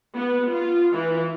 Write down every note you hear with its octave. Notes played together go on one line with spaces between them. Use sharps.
B3
F4
E3